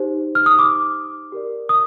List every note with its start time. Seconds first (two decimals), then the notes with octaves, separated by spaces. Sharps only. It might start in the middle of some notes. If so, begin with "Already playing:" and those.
Already playing: D#4 G4 C5
0.35 F6
0.46 D#6
0.59 D6
1.32 G4 A#4 D5
1.69 D#6